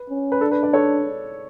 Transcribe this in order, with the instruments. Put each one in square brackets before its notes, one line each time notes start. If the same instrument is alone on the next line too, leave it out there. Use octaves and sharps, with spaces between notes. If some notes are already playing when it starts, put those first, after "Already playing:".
Already playing: [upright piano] B4
[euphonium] C#4
[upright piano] B4
[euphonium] D4 [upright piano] A4
[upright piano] B4
B4 D5
A4 C#5